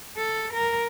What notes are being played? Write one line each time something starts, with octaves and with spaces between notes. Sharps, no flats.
A4
A#4